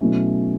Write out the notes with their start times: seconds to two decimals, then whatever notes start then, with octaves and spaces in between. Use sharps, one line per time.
0.01 B2 F#3 A3 C#4 E4